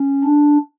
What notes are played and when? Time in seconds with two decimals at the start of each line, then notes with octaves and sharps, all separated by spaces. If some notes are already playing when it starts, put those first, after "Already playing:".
Already playing: C#4
0.24 D4